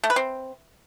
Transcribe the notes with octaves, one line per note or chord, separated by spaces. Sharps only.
A3
B4
C4